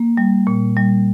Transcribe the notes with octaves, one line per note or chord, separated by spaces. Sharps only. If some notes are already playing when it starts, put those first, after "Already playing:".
Already playing: A#3
G3
A#2
G3